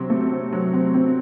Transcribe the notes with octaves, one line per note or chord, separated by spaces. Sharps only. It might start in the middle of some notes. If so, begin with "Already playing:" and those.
Already playing: C3 F#3 C4
A3
C4
F#3
C4
C4